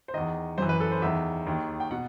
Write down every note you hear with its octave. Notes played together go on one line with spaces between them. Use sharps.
C5
E2 D#3 D#5
F#2 E3 C5
B4
A4
C5
E2 D#3 E5
D#2 D#3
G5
B2 F#5